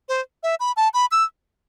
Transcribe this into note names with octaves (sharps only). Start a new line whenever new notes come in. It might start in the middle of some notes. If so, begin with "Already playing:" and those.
C5
E5
B5
A5
B5
E6